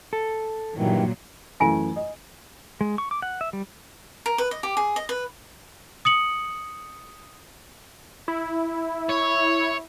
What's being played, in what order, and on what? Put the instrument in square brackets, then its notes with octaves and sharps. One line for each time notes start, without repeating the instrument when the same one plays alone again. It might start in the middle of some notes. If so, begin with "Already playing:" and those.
[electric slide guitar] A4
[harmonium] G2 D#3 E3 [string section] A#2 F#3
[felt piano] F#2 E3 A3 [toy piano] F4 G#5
[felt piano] D#5
[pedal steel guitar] G#3
C#6
D6
F#5
E5
G3
[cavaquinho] A#4
B4
D#5
G4
G#4
D#5
B4
[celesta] D#6 C#7 F#7
[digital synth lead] E4
[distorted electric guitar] C#5